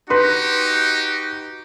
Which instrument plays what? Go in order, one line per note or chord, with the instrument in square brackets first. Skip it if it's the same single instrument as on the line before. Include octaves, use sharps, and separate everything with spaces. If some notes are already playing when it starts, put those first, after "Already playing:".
[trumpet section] D#4 F#4 G4 [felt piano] B4 C6